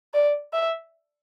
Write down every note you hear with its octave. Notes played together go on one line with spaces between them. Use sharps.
D5
E5